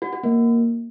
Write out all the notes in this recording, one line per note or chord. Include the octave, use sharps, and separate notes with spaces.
F#4
F#4
A#3